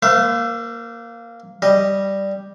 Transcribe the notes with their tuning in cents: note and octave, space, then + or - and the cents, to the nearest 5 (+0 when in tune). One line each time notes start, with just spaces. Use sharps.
A#3 +0 C5 -35 E5 +25
G3 +0 D#5 +0